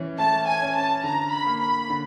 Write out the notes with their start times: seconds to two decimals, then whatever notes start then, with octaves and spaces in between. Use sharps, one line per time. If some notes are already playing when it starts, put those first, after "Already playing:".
Already playing: E3 C#4
0.19 A3 A5
0.47 G#5
0.62 C#4
0.75 A5
1.04 D3 A#5
1.32 B5
1.46 A#3
1.61 B5
1.90 D3